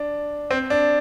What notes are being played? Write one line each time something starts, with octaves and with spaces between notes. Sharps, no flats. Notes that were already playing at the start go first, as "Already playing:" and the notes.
Already playing: D4
C4
D4